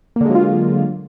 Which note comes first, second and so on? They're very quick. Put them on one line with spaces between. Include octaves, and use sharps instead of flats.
A#3 D3 G#3 F#3 F4